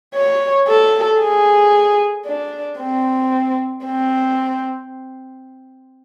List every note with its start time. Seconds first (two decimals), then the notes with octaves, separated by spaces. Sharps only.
0.15 C#5
0.68 A4
1.20 G#4
2.26 D4
2.79 C4
3.85 C4